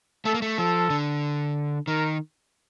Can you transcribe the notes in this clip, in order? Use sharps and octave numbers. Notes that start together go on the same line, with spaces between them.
A3 A4
A#3
A3
F3 A4
D3
D#3 A#4